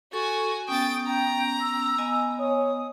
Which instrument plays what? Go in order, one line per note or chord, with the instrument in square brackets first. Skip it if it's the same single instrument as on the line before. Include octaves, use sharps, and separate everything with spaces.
[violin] F#4 G#5 [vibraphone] A4 C#6
[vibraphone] B3 C#4 [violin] G5 A6 [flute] D#6
[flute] G5 [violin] A#5
[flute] E6
[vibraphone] B3 D#5 G#5
[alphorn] C#5 [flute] D#6